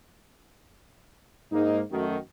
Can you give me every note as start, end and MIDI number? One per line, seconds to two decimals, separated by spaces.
1.52 1.81 44
1.52 1.81 58
1.52 1.81 63
1.91 2.17 42
1.91 2.17 51
1.91 2.17 57
1.91 2.17 66